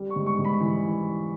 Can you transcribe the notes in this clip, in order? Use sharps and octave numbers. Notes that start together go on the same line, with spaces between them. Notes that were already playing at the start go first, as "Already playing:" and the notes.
Already playing: G3
C#6
G#2
C#6
G#2
B5
E3